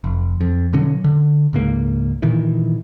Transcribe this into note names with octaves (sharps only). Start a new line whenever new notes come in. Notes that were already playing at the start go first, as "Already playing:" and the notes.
F1
F2
B2 D3 F#3 C#4
D3
C#2 G#2 A#3
A#2 D#3 E3